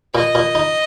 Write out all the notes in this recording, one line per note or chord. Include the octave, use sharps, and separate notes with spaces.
A#2 D#5
A#2
D#4